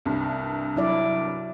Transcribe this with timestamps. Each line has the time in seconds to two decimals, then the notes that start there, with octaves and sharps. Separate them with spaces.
0.05 C2 G2
0.76 F#3 E4 D5